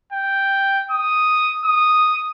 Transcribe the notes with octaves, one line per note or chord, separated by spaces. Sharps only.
G5
D#6
D#6